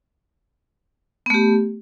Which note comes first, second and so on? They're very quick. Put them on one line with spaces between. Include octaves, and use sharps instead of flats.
B3 A3 G4